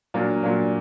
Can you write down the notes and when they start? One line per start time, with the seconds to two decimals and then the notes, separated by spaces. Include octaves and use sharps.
0.14 A#2 F#3 A#3 D4
0.43 A#2 F#3 A#3 D4